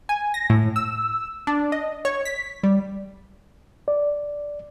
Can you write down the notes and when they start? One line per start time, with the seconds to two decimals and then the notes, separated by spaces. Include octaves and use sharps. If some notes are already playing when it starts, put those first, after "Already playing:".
0.09 G#5
0.34 A#6
0.50 A2
0.76 E6
1.47 D4
1.72 D#5
2.05 C#5
2.25 B6
2.63 G3
3.88 D5